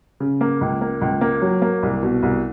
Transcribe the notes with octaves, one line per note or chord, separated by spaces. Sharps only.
C#3
A#3
C#2
A#3
C#2
A#3
F#3
A#3
C2
B2
C2